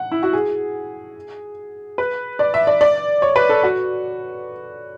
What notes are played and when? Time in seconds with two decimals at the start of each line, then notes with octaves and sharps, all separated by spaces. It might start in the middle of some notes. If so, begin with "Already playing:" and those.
Already playing: F#5
0.12 E4
0.23 F#4
0.33 G#4
1.98 B4
2.39 D5
2.54 E5
2.67 D5
2.81 D5
3.22 C#5
3.36 B4
3.49 A4
3.63 F#4